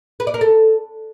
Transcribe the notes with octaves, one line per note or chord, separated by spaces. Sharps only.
B4
D5
A#4
A4